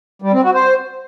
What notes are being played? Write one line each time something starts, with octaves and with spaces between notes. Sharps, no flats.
G3
C4
F#4
C5